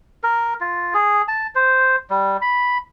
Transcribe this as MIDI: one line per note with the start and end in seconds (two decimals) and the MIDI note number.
0.23 0.54 70
0.61 0.94 65
0.94 1.22 68
1.28 1.47 81
1.55 1.96 72
2.10 2.37 55
2.42 2.78 83